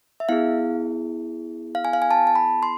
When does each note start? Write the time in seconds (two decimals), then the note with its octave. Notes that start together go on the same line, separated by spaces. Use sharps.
0.20 E5
0.29 B3 E4 G#4 F5
1.75 F5
1.85 G#5
1.93 F5
2.02 G#5
2.11 A5
2.27 A5
2.36 B5
2.63 C6